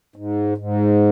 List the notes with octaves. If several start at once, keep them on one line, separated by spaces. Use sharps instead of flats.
G#2
G#2